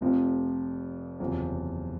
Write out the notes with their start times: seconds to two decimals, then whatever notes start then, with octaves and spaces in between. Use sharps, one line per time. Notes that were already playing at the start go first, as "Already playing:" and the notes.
0.01 F1 F2 C3 F3
1.20 F#1 E2 C3 F3